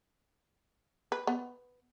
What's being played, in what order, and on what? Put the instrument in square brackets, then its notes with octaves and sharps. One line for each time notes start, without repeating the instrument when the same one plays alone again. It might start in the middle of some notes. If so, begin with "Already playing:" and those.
[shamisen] B4
B3